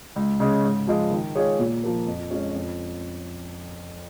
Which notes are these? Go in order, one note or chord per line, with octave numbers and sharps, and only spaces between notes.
C#2
C#3 G#3 C#4
G#2
F3 G#3 F4
D#3
G#3 F4 G#4 C#5
A#2
F3 A#3
F2
F3 G#3 C#4
F2